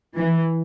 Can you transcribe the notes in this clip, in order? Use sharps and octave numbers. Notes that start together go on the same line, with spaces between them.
E3